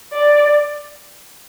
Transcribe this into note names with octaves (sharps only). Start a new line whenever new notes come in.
D5